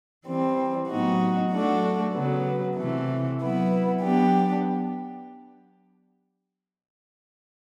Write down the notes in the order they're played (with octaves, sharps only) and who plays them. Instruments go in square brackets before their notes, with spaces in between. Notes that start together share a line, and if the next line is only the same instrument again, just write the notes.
[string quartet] E3 G3 C4
A2 F#3 B3 D#4 F#4
F#3 A3 D4 F#4
C#3 F#3 B3
C3 E3 A3
F#3 B3 E4
F#3 B3 D4 G4